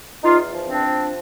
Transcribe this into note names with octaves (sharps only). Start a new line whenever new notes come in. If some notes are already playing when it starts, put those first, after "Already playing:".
E2 D#4 F4
F3
C4 D4
F3